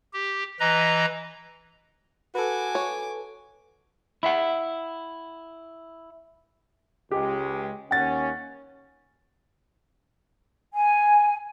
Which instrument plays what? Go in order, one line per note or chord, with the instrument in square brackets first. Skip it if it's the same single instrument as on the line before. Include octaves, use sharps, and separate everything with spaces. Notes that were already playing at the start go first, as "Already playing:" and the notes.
[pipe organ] G4
E3 B4 D#5 A#5
[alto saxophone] F#4 [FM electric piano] A4 B4 [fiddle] G#5 D6
[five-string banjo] C#5
[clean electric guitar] E4 E5 F#5
[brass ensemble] C#2 G#3 [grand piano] G4
[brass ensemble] D#2 C#4 [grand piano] F#5 A6
[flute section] G#5